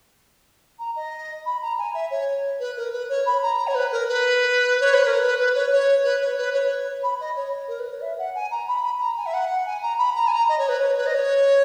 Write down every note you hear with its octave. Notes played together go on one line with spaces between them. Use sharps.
A#5
D#5
B5
A#5
G#5
E5
C#5
B4
A#4
B4
C#5
B5
A#5
C#5
B4
A#4
B4
C#5
B4
A#4
B4
B4
C#5
C#5
B4
C#5
B4
C#5
B5
D#5
C#5
A#4
B4
C#5
E5
F#5
G#5
A#5
B5
A#5
G#5
E5
F#5
G#5
A#5
B5
A#5
G#5
A#5
D#5
C#5
B4
C#5
B4
D#5
C#5